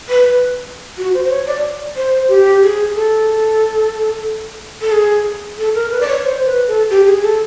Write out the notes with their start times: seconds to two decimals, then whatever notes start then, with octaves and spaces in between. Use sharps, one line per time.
0.09 B4
0.98 F#4
1.14 C5
1.25 C5
1.31 C#5
1.47 D5
1.96 C5
2.28 G4
2.62 G#4
2.95 A4
4.81 A4
4.92 G#4
5.58 A4
5.75 A#4
5.91 B4
6.01 D5
6.08 C#5
6.24 C5
6.45 B4
6.67 A4
6.90 G4
7.07 G#4
7.22 A4